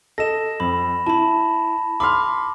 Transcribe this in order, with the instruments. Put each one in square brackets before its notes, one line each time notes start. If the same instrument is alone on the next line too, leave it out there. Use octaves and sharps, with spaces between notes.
[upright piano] A4 D#5 [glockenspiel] A#6 E7
[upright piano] F2 [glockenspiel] B5
[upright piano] E4 [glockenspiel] A5 B5
[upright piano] B5 C6 F6 [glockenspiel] D6